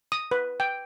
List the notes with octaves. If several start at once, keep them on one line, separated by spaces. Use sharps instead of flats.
D#6
B4
G5